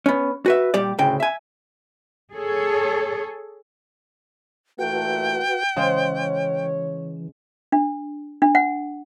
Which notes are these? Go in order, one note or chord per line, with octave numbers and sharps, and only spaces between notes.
B3 C#4
F#4 B4 E5
A#2 G3 G4 D5
D2 A2 C#3 G5
E5 G#5
G#4 A4 C#5
A#2 E3 A3 F#4 B4 F#5 G5
C#3 E3 G#3 C5 C#5
D4
D4
F#5